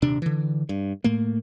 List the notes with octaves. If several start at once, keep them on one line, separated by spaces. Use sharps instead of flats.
D#1 C3 D4
D3 E3
G2
A2 A3 A#3